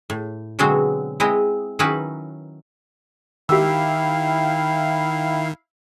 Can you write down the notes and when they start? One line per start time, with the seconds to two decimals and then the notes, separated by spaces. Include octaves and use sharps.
0.10 A2
0.59 B2 D3 F#3 G#3 C4 F#4
1.20 G#3 C4 E4 D#5
1.79 D#3 F#3 C#4 D#4 E4 B4
3.49 D#3 E4 G4 F5 G5 E6